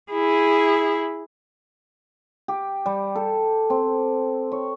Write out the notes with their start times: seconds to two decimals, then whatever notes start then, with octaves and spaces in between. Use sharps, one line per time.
0.12 E4 G#4
2.48 G4
2.86 G3
3.15 A4
3.70 C4
4.52 C#5